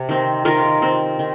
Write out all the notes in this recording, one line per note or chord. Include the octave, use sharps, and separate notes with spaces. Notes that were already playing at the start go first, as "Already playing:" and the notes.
Already playing: C3
D#3 C4
D#3 F4 A#4
C4
D#3